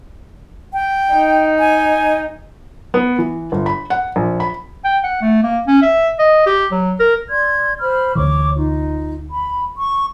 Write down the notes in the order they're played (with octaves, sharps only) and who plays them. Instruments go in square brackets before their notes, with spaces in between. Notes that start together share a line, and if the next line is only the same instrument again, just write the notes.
[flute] G5
[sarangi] D#4
[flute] G#5
[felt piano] B3
E3
G1
B5
F#5
A#1
B5
[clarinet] G5
F#5
A3
A#3
C#4
E5
D#5
G4
F#3
A#4
[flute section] D5 C6 G#6
C5 B5 F6
[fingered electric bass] D2 D3 E3 [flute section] C#5 C#6 D6
[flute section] D#4 F4
B5
C#6